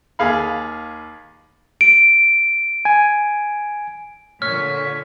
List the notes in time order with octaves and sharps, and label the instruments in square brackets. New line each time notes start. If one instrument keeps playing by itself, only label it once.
[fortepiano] D#2 G#4 F5 B5
[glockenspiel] D7
[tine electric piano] G#5
[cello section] A#2 D3 [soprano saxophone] C#5 [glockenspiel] F6 [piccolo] B6